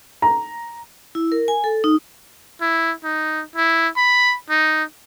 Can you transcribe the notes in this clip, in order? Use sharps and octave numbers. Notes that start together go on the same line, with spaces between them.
A#5
E4
A#4
G#5
A4
D#4
E4
D#4
E4
B5
D#4